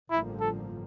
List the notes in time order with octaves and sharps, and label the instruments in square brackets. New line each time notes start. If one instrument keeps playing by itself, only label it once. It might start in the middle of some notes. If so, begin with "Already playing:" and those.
[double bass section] A1 G2 D3 F3 A#3 [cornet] E4
[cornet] A4